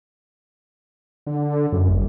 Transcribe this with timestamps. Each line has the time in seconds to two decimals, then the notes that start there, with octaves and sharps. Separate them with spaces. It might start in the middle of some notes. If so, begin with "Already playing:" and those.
1.27 D3
1.72 F#2
1.89 G1